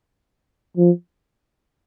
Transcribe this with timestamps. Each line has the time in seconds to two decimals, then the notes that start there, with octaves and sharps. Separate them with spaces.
0.77 F3